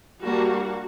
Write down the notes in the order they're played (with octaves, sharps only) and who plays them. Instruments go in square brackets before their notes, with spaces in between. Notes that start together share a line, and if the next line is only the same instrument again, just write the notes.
[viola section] G3 A#3 D4 F#4